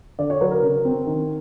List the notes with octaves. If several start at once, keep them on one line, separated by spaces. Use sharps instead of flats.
D3 D5
C#5
F#3 B4
A#4
C#3 A#4
C4
D#3